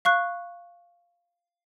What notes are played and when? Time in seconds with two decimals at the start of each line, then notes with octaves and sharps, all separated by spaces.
0.05 F5 C#6 F#6